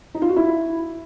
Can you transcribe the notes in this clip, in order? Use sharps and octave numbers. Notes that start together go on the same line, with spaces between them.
D#4
F4
F#4
E4